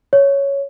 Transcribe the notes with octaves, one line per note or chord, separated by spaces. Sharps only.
C#5